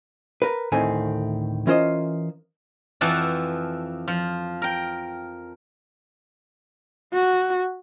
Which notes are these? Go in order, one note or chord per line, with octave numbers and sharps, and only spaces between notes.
A#4 B4
D2 A2 D#3 A3 C4 G#5
E3 C#4 F4 A#4 C5 D#5
F2 E3 F3 F#5 A5
F3
A#4 G5
F#4